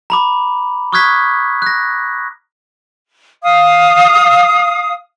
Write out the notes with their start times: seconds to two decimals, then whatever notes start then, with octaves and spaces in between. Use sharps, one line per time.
0.10 A#5 B5 D6
0.93 C#6 D#6 F6 F#6 G#6 B6
1.62 F#6 A#6
3.43 F5 D#6